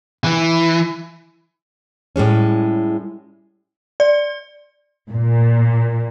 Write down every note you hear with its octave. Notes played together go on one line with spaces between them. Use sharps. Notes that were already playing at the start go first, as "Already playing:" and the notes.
E3
A2 G3 G#3 C#4
D5
A#2